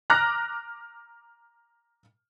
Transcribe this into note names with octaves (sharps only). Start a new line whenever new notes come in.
A#5 D6 F6 F#6 A#6